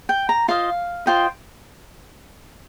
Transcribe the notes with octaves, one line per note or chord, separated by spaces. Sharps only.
G5
A#5
F4 C5 D#5 F5
F4 C5 D#5 G5